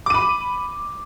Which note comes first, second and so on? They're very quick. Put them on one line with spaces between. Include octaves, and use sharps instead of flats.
D6 D#7 B5